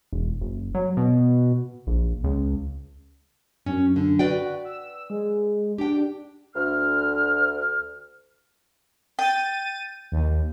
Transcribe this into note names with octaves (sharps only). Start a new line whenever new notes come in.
E1
F#1
F#3
B2
A#1
C#2
F#2 C#4
D3
F#4 B4 D5 G5
E6
G#3
D4 G4 G5
D2 F6
G5 A6 D#7
D#2